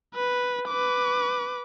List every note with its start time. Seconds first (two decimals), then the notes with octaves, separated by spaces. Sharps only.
0.15 B4
0.68 B4 D6